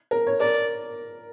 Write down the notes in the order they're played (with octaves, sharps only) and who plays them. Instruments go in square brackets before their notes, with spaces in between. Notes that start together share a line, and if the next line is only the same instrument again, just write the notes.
[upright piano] A#4
C#5
[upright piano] A#4 [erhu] D5